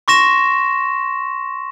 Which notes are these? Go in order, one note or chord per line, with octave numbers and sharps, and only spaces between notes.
C6 C#6 A#6 E7